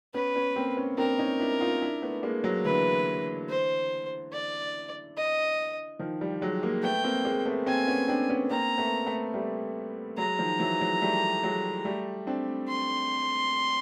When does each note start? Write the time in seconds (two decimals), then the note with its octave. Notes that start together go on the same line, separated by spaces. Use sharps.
0.14 B3 C#4 B4
0.35 B3 C#4
0.56 A#3 C4
0.77 B3 C#4
0.98 C4 D4 A#4
1.19 C#4 D#4
1.40 D4 E4
1.61 D#4 F4
1.82 D4 E4
2.02 A3 B3
2.23 G#3 A#3
2.44 F#3 G#3
2.65 D3 E3 B4
3.49 C5
4.32 D5
5.17 D#5
5.99 D#3 F3
6.21 F3 G3
6.42 F#3 G#3
6.62 G#3 A#3
6.83 A3 B3 G5
7.04 A#3 C4
7.25 G#3 A#3
7.46 A3 B3
7.67 A#3 C4 G#5
7.88 B3 C#4
8.08 C4 D4
8.30 B3 C#4
8.50 A#3 C4 A#5
8.78 A3 B3
9.06 A3 B3
9.34 G3 A3
10.17 F#3 G#3 A#5
10.39 D#3 F3
10.59 E3 F#3
10.80 F#3 G#3
11.02 G3 A3
11.43 F#3 G#3
11.85 G3 A3
12.27 C4 D4
12.69 C6